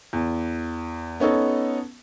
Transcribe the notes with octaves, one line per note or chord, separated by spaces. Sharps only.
E2
B3 C#4 D#4 A4